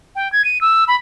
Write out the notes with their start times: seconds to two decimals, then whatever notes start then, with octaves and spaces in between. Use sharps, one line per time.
0.16 G5
0.32 G#6
0.45 D#7
0.61 E6
0.88 B5